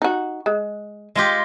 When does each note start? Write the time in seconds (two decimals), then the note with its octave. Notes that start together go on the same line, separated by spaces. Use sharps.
0.02 D#4 F#4
0.46 G#3
1.15 G#3 F4 G4